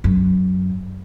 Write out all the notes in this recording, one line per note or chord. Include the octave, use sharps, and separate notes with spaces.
F#2